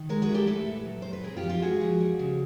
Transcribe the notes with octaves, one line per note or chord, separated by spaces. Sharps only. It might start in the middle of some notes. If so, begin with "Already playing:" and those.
Already playing: D#3
G#3 G#4 A#4
F#4 G#4
E4
G4 A4
A3 A4 B4
A#2
F#3
A#2 C5
B4
C4 G#4 A#4
F4 G4
F3
F4 G4
G#3 F#4 G#4
F3
G3
C#3